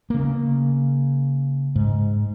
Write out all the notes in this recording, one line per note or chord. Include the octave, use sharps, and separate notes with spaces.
C#3 A#3
G#2